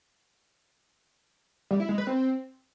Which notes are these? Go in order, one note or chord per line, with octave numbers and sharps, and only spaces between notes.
G3
E4
G#3
B4
C4